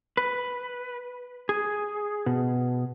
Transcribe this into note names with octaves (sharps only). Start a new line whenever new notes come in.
B4
G#4
B2